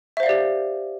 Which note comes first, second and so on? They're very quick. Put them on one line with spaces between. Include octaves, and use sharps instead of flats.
E5 C5 F5 D5 G4